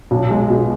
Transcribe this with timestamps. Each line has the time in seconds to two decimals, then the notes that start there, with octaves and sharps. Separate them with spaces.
0.11 B1
0.31 G#3
0.50 B2